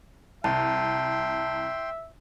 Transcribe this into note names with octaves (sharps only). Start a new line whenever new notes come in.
C2 E5 G5 A5 C6